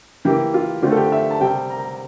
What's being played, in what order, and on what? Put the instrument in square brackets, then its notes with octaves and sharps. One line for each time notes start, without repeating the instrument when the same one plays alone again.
[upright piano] E3 A#3 G4
F4
D3 A3 C4 F4
A4
G4
E5
A5
C3 G3 C4 G5
A#5